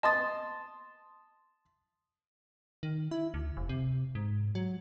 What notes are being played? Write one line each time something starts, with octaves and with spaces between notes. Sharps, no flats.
D#5 A5 C6 D#6 A6
D#3
E4
D2
F1
C3
G#2
F#3